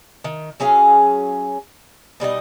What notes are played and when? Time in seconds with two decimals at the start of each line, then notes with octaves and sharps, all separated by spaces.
0.24 D#3
0.60 F#3 C#4 G#4 F5
2.20 B2 G3 D#4 D#5